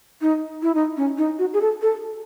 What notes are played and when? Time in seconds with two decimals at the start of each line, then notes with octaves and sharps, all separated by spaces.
0.21 D#4
0.62 E4
0.75 D#4
0.97 C#4
1.17 D#4
1.39 F#4
1.53 G#4
1.61 A4
1.82 A4